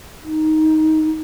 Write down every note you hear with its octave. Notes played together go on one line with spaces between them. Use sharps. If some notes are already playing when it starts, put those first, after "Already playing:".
D#4